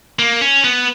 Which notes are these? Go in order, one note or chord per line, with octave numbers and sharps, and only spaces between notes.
A#3
C#4
B3